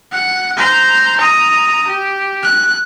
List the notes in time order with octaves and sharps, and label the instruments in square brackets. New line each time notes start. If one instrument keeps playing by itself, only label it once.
[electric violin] F#5
C5 A#5
A#5 D#6
G4
F#6